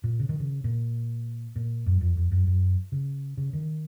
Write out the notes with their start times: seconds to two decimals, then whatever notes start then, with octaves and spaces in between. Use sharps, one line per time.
0.04 A#2
0.19 C#3
0.29 D#3
0.40 C#3
0.64 A#2
1.56 A#2
1.86 F#2
2.01 F2
2.17 F2
2.32 F#2
2.47 F#2
2.92 C#3
3.37 C#3
3.53 D#3